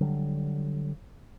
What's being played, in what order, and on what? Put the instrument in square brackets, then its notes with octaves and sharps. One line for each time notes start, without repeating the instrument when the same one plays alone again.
[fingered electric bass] D3 F#3 G3